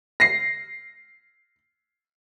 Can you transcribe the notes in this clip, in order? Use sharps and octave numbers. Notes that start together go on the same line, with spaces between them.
A#6 C7